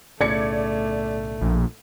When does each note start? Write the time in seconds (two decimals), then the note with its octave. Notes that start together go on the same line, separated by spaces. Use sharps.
0.21 B1 A2 C#3 A3 D5 G#6 C#7
1.41 A#1